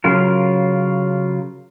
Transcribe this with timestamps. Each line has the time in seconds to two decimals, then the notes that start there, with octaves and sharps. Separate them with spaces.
0.04 C#3 F#3 F4 A#4